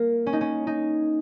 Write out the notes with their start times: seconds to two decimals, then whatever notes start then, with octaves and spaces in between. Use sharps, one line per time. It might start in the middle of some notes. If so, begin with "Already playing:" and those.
Already playing: A#3
0.26 C#4
0.33 D#4
0.41 C#4
0.67 D#4